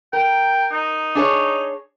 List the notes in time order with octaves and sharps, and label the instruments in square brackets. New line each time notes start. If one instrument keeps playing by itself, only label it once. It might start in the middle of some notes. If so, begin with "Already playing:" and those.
[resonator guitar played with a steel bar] A#4 [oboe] G5
[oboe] D#4
[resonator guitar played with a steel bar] D4 G#4 C#5